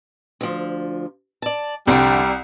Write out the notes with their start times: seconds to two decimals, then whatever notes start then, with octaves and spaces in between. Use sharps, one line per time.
0.41 D2 F3
1.42 D5 A5
1.87 C2 F2 D3 G3 G5